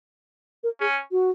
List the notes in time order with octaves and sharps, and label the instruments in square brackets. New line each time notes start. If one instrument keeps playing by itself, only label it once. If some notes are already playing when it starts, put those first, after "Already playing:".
[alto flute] A#4
[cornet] C#4 [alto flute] G#4
[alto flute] F#4